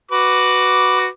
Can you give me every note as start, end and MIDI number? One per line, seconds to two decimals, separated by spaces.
0.11 1.07 66
0.11 1.07 71
0.11 1.07 86